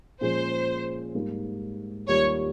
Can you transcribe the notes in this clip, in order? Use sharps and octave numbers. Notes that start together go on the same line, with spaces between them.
A#2 F3 G#3 C#4 G#4 C5
G#2 G3 A#3
D#2 D#3 G3 A#3 F4 C#5